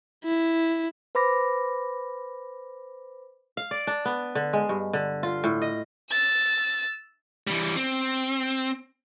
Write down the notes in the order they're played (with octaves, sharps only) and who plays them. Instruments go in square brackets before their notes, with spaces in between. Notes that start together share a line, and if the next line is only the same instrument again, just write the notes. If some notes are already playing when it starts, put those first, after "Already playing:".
[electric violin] E4
[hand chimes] B4 C5 B5 D6 A#6
[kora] F5
D5
D4
B3
D3
G#3
G2
D3
F4
A2
D#5
[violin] E6 A6
[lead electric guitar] E3 G3
C4